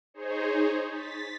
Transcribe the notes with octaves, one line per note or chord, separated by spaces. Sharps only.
D#4 G#4 C5 C#5
A6 B6